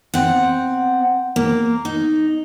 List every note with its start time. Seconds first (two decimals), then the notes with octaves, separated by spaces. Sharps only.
0.14 C4 F#5
1.36 A#3
1.85 D#4